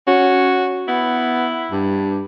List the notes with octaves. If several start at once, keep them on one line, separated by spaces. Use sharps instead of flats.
C#4 F#4
B3 E4
G2